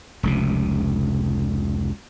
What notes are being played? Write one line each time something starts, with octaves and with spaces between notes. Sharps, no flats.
F1 C#2 C3